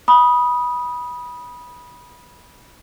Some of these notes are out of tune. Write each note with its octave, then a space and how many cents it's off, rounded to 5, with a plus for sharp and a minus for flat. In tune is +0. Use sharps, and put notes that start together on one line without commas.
B5 -20 D#6 +0